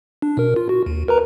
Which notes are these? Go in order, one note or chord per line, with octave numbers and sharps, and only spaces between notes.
D4
B2 A#4
F4
F#4
D#2
A#4 B4 A#5